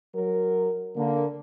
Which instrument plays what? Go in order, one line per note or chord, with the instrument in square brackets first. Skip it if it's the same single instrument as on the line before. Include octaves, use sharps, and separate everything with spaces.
[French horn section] F#3 A#4
D3 A#3